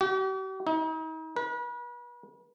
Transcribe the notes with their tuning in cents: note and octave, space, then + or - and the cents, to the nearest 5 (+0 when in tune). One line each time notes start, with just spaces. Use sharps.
G4 -45
D#4 +40
B4 -40